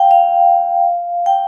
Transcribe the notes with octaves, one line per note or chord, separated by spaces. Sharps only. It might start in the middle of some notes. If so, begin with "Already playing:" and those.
Already playing: F5 G5
F5
G5